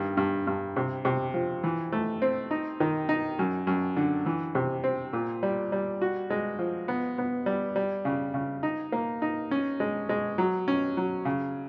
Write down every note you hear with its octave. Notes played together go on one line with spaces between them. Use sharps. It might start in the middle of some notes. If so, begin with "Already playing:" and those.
Already playing: G2 D#3
G2
G2
C3
C3
F3
E3
A3
C4
D#4
D#3
D#4
F#2
F#2
D3
E3
C3
C4
A#2
G3
G3
F#4
G#3
F3
B3
B3
G3
G3
C#3
C#3
D#4
A#3
D#4
C#4
G#3
G#3
F#3
C#4
F#3
C#3